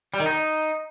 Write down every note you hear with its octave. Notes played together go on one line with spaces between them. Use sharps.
G3
D#3
D#4